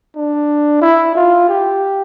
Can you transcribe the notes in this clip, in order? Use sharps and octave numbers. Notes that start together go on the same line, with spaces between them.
D4
E4
F4
G4